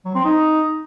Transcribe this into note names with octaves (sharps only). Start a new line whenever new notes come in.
F#3
C4
D#4